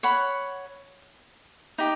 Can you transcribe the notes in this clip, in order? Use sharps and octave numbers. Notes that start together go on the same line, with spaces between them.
C#5 F#5 B5
D#4 G4